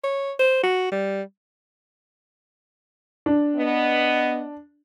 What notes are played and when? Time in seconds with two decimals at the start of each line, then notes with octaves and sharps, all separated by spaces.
0.04 C#5
0.39 C5
0.63 F#4
0.92 G3
3.26 D4
3.57 B3 D#5